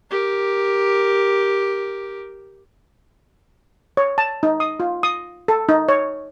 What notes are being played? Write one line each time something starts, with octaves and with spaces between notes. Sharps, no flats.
G4 A#4
C#5
A5
D#4
D#6
F4
D#6
A4
D#4
C#5